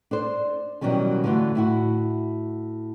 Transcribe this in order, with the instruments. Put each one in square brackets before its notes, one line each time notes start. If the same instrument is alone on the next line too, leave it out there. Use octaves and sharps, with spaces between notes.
[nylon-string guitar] D4 A4 C5
B2 D#3 E3 F#3 G3 C#4
D3 E3 A3 F4 F#4
A2 E4 F#4